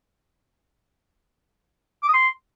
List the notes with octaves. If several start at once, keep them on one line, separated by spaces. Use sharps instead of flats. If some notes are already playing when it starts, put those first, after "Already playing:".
D6
D#6
C6